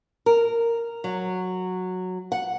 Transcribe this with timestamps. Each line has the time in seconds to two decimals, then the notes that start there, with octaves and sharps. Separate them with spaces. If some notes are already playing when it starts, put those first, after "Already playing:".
0.26 A#4
1.04 F#3
2.32 F#5